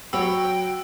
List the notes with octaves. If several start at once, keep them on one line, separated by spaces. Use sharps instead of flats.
F#3 F#4 C#5 G5 B5 E6